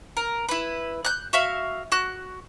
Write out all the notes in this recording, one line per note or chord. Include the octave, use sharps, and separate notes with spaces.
A#4
E4 B4
F#6 G6
F#4 E5 F5
F#4 F#6